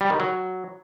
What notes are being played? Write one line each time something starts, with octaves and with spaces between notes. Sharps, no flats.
G3
D#3
F#3